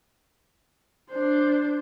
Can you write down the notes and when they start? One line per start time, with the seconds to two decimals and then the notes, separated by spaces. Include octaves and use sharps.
1.11 D4 C5